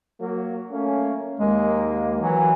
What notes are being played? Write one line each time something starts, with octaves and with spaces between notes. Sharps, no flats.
F#3 A#3
A3 A#3 C#4
D#2 G#3 A#3
E3 F#3